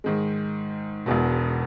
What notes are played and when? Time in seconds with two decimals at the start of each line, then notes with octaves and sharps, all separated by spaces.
0.04 G#2 D#3 G#3
1.06 E1 E2 B2